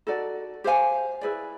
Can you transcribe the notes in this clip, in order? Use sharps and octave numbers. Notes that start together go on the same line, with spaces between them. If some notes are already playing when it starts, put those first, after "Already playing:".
D#4 F#4 A4 D5
G4 C5 F5 G#5
E4 G#4 B4 D5